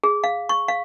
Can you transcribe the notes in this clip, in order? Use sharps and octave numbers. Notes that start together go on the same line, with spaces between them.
G#4
F5
C#6
F5